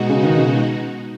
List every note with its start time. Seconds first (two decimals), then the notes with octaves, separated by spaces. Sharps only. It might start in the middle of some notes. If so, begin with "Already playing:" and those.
Already playing: B2 G#3 D#4 F#4
0.09 C#3
0.23 D#3
0.36 C#3